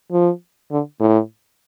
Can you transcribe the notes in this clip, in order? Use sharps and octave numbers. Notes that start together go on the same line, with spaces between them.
F3
D3
A2